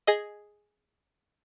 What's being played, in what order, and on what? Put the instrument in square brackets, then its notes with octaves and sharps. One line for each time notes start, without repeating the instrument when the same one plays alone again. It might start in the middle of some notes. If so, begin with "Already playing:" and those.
[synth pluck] G#4 D#5